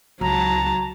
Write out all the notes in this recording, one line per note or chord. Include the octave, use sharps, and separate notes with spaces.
C#2 F#3 A5 A#5